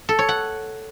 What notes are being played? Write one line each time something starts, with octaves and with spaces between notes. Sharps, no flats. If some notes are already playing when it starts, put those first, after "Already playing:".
A4
C#5
F#5